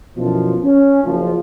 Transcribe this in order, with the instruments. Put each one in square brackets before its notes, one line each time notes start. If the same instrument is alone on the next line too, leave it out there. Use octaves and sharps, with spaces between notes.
[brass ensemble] F#2 B2 E3 F3
C#4
F#1 F3